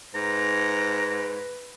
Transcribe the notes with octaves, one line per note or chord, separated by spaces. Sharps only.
G#2 B4 A#5